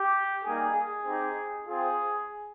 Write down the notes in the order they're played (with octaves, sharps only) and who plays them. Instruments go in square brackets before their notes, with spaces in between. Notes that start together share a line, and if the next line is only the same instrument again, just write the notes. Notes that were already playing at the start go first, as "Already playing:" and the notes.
Already playing: [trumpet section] G4
G3 A#3 D#4 G4 G#4
G#4
C4 D#4 G4
C4 F4 G#4